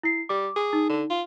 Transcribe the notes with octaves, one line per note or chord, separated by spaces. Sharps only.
E4 C7
G3 D6
G#4
D#4
D3
F4